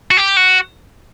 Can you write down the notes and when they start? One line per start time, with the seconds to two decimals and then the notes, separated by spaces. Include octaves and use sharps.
0.11 F#4
0.17 G4
0.37 F#4